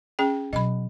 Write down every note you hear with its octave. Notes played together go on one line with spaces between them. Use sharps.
C#4 G#4 G5
B2 F#3 D#5 B5